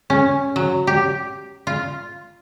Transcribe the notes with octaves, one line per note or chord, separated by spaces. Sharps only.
C#4
F#3
G4
F4